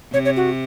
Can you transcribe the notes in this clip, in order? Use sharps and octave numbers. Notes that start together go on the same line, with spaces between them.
C3 C#5
C#5
F#4